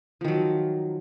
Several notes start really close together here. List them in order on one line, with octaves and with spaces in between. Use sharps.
F3 D#3 F#3